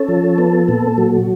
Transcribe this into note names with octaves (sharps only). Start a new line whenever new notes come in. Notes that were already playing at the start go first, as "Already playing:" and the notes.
Already playing: C#4 A4
F3
B3
A#2
F#3